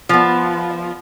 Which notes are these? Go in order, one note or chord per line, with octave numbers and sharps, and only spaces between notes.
F3 B3